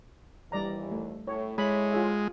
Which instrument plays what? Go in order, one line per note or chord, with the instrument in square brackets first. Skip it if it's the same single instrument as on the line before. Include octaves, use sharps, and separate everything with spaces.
[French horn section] D#2 E3 [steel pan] G3 D5 A#5
[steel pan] A3
[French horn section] A2 [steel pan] C#5
[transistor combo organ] G#3 [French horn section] E4 A4 C#5 [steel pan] B5
[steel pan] F4 G#4 E5